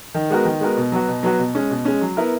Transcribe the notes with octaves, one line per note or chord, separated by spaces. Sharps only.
D#3
G#3 B3 F#4 A#4
D#3
G#3 B3 F#4 A#4
B2
F#3 B3 F#4
B2
F#3 B3 F#4
B2
G#3 C#4
B2
G#3 C#4
F#3
B3 E4 A#4